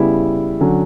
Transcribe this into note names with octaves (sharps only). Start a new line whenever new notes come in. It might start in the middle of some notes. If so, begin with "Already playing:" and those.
Already playing: C#3 G3 B3 E4
D3 F#3 C#4